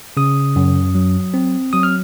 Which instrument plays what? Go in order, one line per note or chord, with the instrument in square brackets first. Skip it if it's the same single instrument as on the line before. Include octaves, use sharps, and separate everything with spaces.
[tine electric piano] C#3 D#6
F#2
F#3
C4
F#3 D#6
F6